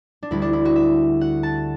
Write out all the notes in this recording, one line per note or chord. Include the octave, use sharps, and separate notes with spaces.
D4
D2 D3 G3 E4
D4
E4
F#4
E5
F#5
A5